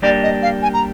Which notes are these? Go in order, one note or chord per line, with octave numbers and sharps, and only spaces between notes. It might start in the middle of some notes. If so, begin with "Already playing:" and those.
G3 A#3 D4 G4 D5
D#5
F5
G#5
A#5